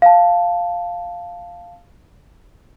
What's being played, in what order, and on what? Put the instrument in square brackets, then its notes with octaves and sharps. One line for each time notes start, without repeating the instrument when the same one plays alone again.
[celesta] F5 A5